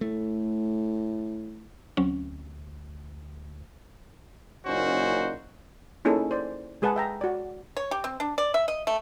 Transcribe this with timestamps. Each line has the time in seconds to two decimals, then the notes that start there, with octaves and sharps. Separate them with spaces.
0.01 A2 A3
1.97 D2 F#3 C4 C#4
4.66 F#1 A#2 C#4 D#4 F#4 C5
6.05 A#3 C#4 D#4 E4 G#4 A4
6.31 C5 D5
6.82 G#3 G#4 B4 F#5 A5
6.96 E5 G5 A#5
7.21 F#4 D5
7.77 C#5
7.91 G4
8.04 C4
8.20 D4
8.38 D5
8.54 E5
8.68 D#5
8.87 A3